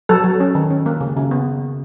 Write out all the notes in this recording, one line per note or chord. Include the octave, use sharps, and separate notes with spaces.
F#3 A4
F#3
C#4
D#3
C#4
A#3
C#3
C#3
B3